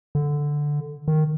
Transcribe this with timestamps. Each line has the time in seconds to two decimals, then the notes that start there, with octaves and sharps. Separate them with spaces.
0.15 D3
1.08 D#3